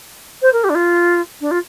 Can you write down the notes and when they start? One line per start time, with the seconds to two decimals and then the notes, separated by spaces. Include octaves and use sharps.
0.42 C5
0.53 A#4
0.64 G4
0.69 D4
0.75 F4
1.40 D4
1.51 F4